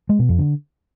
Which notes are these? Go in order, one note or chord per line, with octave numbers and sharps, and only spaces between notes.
G#3
B2
F2
D3